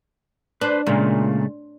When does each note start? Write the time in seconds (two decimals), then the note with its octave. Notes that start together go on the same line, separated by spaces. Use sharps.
0.61 D4 B4 C5
0.87 A#2 C#3 G#3 A3